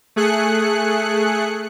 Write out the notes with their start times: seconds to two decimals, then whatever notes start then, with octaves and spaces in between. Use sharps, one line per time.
0.16 A3 G#4 F#6 C#7